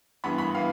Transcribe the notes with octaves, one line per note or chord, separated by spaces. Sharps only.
G2 E3 B3 B5
B5
E3 B3 F5